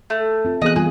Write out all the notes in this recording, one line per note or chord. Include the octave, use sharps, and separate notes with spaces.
A3
C4 F4
E3 B3 G#4 D#5 F#6
G3 F4 G#4